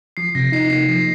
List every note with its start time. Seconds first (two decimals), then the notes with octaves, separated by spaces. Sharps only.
0.17 F3 C7
0.35 C3 A#6
0.52 D#4 C7
0.70 A#3 C7
0.89 F3 C7